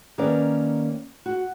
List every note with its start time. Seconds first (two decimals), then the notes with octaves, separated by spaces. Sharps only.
0.18 D#3 A#3 C#4 B4 D5
1.26 F#4